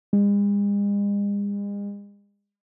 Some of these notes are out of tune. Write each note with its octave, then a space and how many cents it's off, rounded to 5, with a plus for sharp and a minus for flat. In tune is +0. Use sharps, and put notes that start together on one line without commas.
G#3 -45